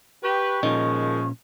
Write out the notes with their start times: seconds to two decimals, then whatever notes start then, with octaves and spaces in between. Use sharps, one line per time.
0.23 G4 B4 C#6
0.63 A#2 D#3 F3 G#3 C#4